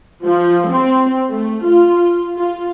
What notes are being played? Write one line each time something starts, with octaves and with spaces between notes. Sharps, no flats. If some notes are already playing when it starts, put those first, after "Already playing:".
F3
C4
A3
F4
F4